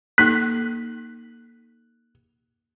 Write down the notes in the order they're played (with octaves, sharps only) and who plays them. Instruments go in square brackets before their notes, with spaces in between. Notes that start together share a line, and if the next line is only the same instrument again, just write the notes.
[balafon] A#3 D#4 A4 [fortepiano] F#6 [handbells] B6